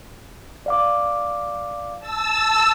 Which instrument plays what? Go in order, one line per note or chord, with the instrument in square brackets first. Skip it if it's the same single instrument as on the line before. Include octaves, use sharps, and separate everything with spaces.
[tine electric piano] D5 F5 D6
[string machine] A5 E6